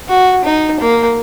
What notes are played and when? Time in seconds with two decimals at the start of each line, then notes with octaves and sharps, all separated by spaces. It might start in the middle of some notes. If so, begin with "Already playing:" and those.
0.08 F#4
0.44 D#4
0.80 A#3